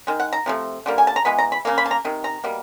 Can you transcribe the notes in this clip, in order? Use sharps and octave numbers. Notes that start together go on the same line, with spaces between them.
D#3 G#3
F#5
A#5
C3 F3 A3
D3 G3 A#3
G#5
A5
A#5
E3 G#3 B3 B5
A#5
B5
C#3 F3 A#3
B5
A5
A#5
C3 D#3
A#5
B2 G3 A#3